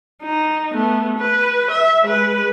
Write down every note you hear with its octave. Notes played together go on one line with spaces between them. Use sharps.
D#4
A3 B3
B4
E5
G#3 B4